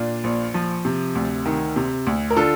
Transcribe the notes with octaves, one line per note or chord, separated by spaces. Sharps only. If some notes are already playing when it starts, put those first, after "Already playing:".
Already playing: A#2 D4 F4
A#1
F3
C3
D2
D#3
C3
D2
A#4
D3 F4 A4